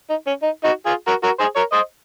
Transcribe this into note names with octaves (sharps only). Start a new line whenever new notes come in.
D#4
C#4
D#4
D#4 F#4
F4 G#4
F#4 A#4
F#4 A#4
G#4 C5
A#4 C#5
C5 D#5